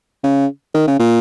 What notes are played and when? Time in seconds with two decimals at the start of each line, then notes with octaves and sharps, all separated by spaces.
0.24 C#3
0.75 D#3
0.87 C#3
0.99 A#2